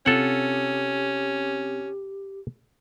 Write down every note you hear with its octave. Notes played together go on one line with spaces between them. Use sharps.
C3 C#4 F4 G4 A4 F#5